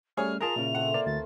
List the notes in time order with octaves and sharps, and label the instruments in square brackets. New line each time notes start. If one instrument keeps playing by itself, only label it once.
[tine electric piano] G3 A3 C#4 [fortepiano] G#4 C#5 [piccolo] F6
[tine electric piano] F4 G#4 A#5 [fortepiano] A#4 A5 [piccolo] F7
[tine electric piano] A#2 C#3 [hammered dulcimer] E4
[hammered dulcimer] A3 C4 [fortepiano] F#5
[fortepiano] A#3 [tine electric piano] D5
[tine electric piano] D2 [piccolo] A6